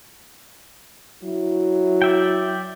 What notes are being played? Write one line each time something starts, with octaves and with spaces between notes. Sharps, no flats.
F#3 E4
D5 E5 G5